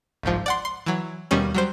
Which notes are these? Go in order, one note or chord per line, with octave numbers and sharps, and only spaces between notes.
G1 C2 G#2 F3
D5 F#5 C6
C6
E3 F#3
D#2 B2 D#3 G3 C#4
F#3 G3 C5